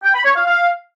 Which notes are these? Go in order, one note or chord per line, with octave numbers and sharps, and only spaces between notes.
G5
B5
C#5
F5
F5